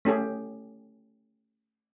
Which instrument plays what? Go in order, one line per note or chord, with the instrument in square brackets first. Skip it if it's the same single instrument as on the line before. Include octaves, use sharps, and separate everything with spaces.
[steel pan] A3 C#4 G4 G#4